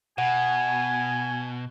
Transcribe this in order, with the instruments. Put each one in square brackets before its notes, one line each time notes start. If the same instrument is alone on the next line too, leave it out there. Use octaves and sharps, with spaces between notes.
[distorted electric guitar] B2 [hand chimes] F#5 [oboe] G#5